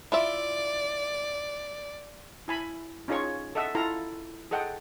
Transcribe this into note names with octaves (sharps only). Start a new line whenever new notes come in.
E4 F4 D5 E5
E4 G#5 B5
C#4 D#4 F4 G#4 C#5 C#6
A4 D#5 E5 F#5 E6
E4 F4 A4 F5 A#5
G#4 A4 D#5 F#5 G5